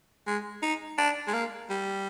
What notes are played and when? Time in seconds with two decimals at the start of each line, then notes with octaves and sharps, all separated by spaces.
0.27 G#3
0.62 D#4
0.98 D4
1.27 G#3
1.34 A#3
1.70 G3